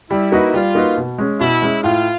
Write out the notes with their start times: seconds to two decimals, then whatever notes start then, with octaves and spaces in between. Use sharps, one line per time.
0.11 G3 E4
0.32 A#3 D#4 F#4 B4
0.53 G3 F4
0.75 A#3 D#4 F#4 B4
0.97 B2
1.18 G#3 C#4
1.40 B2 E4
1.62 G#3 C#4
1.83 A2 F4